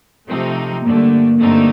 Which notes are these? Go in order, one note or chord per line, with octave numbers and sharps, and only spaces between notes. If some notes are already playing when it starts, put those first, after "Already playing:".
C3 F3 A3 C4 D#4
G2 D3 A3 A#3
G2 D3 A3 C4 D#4